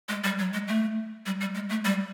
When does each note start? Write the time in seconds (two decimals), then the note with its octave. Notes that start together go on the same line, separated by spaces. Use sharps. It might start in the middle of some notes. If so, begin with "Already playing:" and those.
0.09 G#3
0.24 G3
0.39 F#3
0.54 G#3
0.68 A3
1.26 G3
1.41 G3
1.55 G#3
1.69 A3
1.85 G3